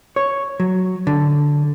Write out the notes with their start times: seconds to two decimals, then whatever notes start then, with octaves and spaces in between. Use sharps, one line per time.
0.16 C#5
0.60 F#3
1.07 D3